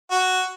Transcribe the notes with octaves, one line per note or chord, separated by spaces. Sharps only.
F#4